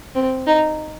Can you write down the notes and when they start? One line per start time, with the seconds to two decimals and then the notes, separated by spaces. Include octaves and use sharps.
0.15 C4
0.47 D#4